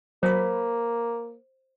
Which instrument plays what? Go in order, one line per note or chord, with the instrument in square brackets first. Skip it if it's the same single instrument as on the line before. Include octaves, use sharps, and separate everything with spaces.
[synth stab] F#3 B5 [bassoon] A#3 [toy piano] C5